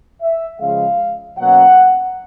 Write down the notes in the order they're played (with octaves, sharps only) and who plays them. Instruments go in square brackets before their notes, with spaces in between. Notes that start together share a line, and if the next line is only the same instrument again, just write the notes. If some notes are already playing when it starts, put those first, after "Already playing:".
[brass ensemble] E5
C#3 F3 G#3 F5
B2 F#3 A#3 C#4 F#5